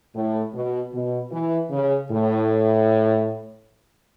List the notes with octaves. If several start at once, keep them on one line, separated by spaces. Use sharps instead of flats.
A2
B2
B2
E3
C#3
A2